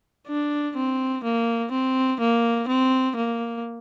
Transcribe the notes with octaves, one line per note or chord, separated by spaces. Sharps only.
D4
C4
A#3
C4
A#3
C4
A#3